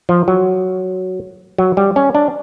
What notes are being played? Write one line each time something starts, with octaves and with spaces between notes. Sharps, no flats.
F3
F#3
F#3
G3
C#4
D4